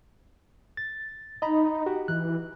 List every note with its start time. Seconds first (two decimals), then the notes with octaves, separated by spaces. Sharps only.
0.77 A6
1.42 D#4 D#5 A#5 B5
1.86 F#4 G4
2.08 E3 F#6